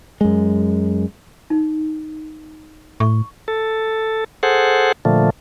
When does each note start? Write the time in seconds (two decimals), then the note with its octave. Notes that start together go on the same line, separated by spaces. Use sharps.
0.21 F#2 G#3
1.50 D#4
3.00 A2 C#6
3.48 A4
4.43 G#4 A4 C5 F#5
5.05 A#2 D3 F3 A3